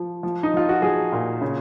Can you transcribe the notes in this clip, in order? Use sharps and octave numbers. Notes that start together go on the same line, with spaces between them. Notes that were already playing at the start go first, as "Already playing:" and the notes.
Already playing: F3
F3
D#4
F3 F4
F#4
F3 G#4
A#2
C#3